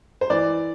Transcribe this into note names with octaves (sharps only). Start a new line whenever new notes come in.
C5
E3 D5